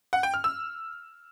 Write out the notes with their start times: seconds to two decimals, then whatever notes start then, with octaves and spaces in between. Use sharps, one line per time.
0.13 F#5
0.23 G5
0.34 F6
0.44 E6